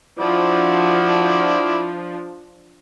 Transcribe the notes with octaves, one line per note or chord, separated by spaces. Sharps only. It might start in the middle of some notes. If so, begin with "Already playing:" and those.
F3 D4 E4 F#4 D5